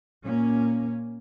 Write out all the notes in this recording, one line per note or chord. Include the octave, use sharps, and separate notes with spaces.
A#2 A#3 C#4